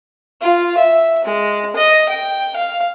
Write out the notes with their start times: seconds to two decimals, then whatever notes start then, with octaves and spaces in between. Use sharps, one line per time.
0.42 F4
0.78 E5
1.24 G#3
1.76 D#5
2.09 G5
2.56 F5